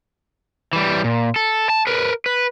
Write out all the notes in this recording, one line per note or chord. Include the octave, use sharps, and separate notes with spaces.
E3 G3
A#2
A4
A5
A#4 B4
B4